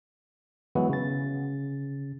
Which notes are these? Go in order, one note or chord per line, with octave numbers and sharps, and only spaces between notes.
E3 F#3 G#3 B3 E4 F#4
C#3 A6